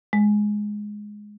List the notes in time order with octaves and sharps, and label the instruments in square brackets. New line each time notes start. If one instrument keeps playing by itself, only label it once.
[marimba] G#3